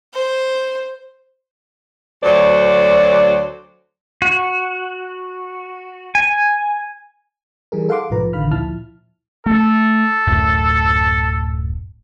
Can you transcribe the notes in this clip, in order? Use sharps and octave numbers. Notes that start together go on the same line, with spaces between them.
C5
D2 F#3 C5 D5
F#4
G#5
E3 G3 G#4 A#4
A4 F5 F#5 C6 D6
B1 G#2 F3 B4 A#5
A1 D3 D#3 F5 B5 F6
D2 A#2 F3 E4 A5 F6
A3 A4
D1 F#2 A2